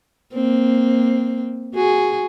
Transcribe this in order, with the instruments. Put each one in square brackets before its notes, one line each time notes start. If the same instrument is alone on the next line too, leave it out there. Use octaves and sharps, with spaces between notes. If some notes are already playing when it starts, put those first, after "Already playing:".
[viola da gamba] A#3 C4
F#4 G#4